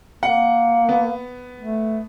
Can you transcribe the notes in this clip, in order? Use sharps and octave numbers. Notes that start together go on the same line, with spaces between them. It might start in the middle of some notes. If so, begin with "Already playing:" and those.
A#3 F#5
B3
A3